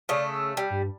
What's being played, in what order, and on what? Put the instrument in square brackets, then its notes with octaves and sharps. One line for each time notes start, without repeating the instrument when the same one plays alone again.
[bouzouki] C#3 A3 [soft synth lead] D5
[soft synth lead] E6
[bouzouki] G3
[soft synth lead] G2